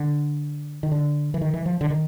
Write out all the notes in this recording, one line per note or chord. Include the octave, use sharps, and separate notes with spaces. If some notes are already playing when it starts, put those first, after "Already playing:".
Already playing: D3
D#3
D3
E3
D#3
E3
F3
D3
D#3